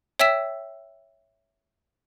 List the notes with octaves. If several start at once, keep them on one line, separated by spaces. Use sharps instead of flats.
C#5 E5 G5 E6 B6 E7